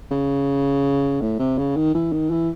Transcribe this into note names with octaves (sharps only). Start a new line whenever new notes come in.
C#3
A2
C3
C#3
D#3
E3
D#3
E3